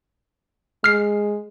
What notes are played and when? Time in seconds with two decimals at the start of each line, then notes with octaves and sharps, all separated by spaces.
0.84 G#3 F6 C7